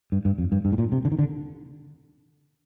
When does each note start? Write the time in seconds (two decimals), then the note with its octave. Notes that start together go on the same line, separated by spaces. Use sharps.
0.12 G2
0.25 G2
0.38 F2
0.52 G2
0.65 G2
0.72 A2
0.78 A#2
0.92 C3
1.05 D3
1.12 D#3
1.19 D3